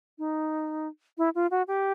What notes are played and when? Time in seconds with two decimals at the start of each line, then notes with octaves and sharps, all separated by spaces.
0.18 D#4
1.18 E4
1.35 F4
1.51 F#4
1.68 G4